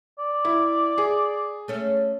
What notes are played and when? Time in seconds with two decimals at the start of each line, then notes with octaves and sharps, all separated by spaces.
0.18 D5
0.45 E4
0.98 G#4
1.68 A3 C#4 E5